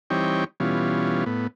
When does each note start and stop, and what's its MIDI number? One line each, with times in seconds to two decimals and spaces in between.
0.10 0.44 52
0.10 0.44 55
0.10 0.44 60
0.10 0.44 63
0.10 0.44 73
0.10 0.44 79
0.60 1.24 47
0.60 1.24 52
0.60 1.24 55
0.60 1.24 61
0.60 1.24 65
1.26 1.47 45
1.26 1.47 59